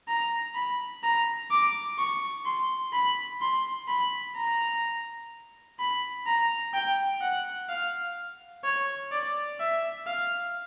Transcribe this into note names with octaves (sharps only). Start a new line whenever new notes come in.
A#5
B5
A#5
D6
C#6
C6
B5
C6
B5
A#5
B5
A#5
G5
F#5
F5
C#5
D5
E5
F5